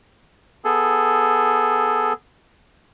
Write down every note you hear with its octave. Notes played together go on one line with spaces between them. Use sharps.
B3 G#4 A4